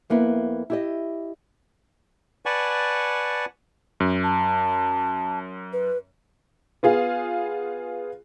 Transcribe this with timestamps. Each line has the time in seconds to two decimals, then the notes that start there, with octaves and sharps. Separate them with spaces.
0.10 F2 A#3 B3 E4
0.70 E4 G4 D#5
2.46 B4 D5 F#5 G#5 A5 C#6
4.00 F#2
4.24 A5
5.73 B4
6.83 B3 F4 G#4 F5